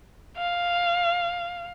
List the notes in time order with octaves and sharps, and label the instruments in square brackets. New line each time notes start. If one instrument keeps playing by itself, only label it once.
[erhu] F5